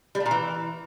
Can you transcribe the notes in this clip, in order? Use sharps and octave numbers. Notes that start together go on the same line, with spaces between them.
G3
A3
A#2
E3